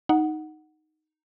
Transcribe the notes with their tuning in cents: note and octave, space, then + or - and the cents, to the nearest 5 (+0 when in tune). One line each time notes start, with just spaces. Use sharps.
D#4 +0 F#5 +0